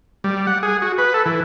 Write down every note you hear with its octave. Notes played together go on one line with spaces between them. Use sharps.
G3
F#5
G#4
F#4
B4
A4
E3